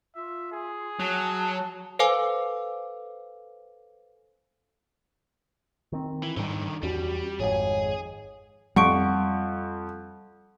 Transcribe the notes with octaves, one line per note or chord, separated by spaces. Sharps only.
F4 E5
G#4
F#3 A5
A4 B4 C5 F5 G#5 D6
D#3 C4
E3
G#2 D3 D#3 G3
E2 G3 C#4 F#4
G#1 F2 G#2 G#4 C#5 G#5
F2 G3 F#5 C#6 D7